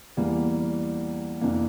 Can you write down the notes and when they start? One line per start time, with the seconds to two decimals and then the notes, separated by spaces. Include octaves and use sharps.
0.17 E2 E3 G3 A#3
1.41 F2 C3 E3 A#3 D4